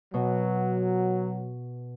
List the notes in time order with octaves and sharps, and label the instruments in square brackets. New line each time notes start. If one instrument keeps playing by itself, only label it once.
[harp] B2 [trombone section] F#3